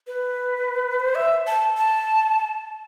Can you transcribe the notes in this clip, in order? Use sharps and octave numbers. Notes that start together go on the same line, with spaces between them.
B4
C5
E5
A5
A5